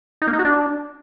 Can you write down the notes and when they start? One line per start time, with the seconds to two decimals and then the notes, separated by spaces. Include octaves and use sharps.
0.22 D#4
0.27 A#3
0.33 D#4
0.39 F#4
0.45 D4